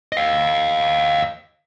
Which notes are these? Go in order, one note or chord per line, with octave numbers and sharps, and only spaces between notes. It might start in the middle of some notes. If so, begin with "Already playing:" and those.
D#5 F5